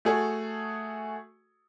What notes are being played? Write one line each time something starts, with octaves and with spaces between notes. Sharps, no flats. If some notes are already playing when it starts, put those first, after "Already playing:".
A3 F#4 G#4 A4